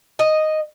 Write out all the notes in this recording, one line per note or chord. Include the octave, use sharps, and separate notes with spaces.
D#5